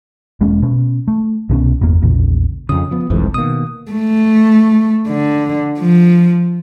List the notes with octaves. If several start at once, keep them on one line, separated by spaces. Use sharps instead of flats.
E1 G#3 A#3 C#4
B2 C#4
A3
C2 B2 B3 C#4
G1 E2 A#3
A#1 E2 A#2 C#3
F2 C#3 D#6
F3 B3
G1 C2 F2 G#2 E3 F3
B2 D#3 A#3 D#6
A3
D3
F3